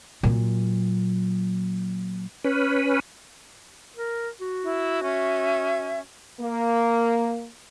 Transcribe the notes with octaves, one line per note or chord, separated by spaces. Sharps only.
A#2 F#3
C#4 B4
A#4
F#4
E4
C#4 E5 G#6
A#3